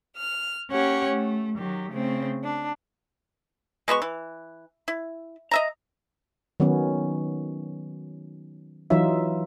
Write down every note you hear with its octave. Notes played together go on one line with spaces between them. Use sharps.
F6
A#3 C#4 G4 C#5 F#5
A3
D#3 F#3 G4
C#3 A3 C4
D4
G#3 B3 F#4 C#6
E3
E4
D#5 E5 A#5
D#3 F#3 B3 C#4
E3 F#3 D#4 F4 E5